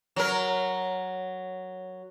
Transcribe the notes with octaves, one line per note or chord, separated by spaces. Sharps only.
F#3 A#4